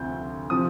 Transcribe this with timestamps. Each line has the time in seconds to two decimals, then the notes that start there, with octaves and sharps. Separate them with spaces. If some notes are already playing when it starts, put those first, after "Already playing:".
Already playing: D2 C3 F3 G6
0.50 C3 F3 D#6